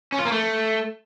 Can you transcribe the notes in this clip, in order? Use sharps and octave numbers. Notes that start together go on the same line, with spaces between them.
C#4
F4
A#3
A3